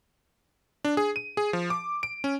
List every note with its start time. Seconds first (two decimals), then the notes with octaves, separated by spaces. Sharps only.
0.85 D4
0.97 G#4
1.16 D#7
1.37 G#4
1.53 F3
1.70 D6
2.03 D7
2.24 C#4